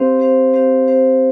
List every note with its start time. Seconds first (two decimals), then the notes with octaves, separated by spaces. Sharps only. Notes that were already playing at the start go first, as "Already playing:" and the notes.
Already playing: C4 G4 C5 F5
0.19 C4 G4 C5 F5
0.53 C4 G4 C5 F5
0.87 C4 G4 C5 F5